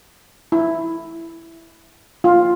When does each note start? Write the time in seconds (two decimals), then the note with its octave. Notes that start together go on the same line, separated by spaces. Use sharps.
0.52 E4
2.24 F4